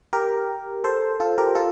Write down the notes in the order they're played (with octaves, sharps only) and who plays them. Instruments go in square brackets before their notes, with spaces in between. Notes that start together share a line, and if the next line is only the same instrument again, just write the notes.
[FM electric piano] G4 A#4
A4 C5
F4 A4
G4 A#4
F4 A4